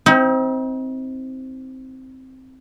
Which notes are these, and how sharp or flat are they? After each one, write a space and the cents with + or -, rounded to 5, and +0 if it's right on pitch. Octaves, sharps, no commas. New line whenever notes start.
C4 +0 D#4 +40